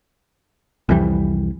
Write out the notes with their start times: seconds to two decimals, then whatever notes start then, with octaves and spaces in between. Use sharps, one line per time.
0.89 C2 F2 E3 G3